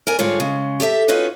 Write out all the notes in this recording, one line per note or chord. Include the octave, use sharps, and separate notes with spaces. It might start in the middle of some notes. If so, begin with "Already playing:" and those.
A#4 D5 G#5
G#2 D3 G3 F4 G#4 C#5
C#3 G#3
G4 A4 D5 E5
C#4 D#4 F4 F#4 B4 C#5